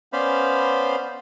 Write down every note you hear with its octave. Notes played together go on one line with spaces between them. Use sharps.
B3 C#4 C5 D5 F5 B5